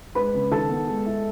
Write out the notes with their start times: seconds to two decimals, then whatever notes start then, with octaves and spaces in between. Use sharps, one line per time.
0.15 G#3 B4 B5
0.34 C#3
0.51 D#3 A4 A5
0.69 B3
0.87 G#3
1.06 E4